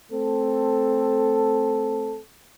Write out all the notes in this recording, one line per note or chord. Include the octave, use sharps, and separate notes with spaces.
A3 C4 A4